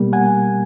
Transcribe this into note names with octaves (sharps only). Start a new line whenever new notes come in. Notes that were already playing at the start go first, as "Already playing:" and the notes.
Already playing: B2 G3 A#3
F#5 G#5